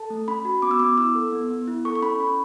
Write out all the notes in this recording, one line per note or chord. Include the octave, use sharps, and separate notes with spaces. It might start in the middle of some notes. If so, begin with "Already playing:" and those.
Already playing: A4 A5
A3
C#4 B5
F#4
B3 D6
E6
B3 D6
E4 E6
A4
B3
B3
E4
A4 C#6
C#6
C#4 B5
C#4